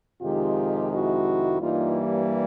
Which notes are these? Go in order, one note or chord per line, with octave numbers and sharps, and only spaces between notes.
F2 C3 D#3 G#3 F4 G4
E4 F#4
G2 E3 G3 A#3 D#4 F4